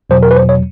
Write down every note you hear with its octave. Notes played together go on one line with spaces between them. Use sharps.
E2 B2 F#3 C5
A#4
B4
C5
C#5